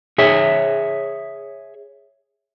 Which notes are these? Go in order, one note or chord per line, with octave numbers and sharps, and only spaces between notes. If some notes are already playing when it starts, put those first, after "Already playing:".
G#4 C#5 E5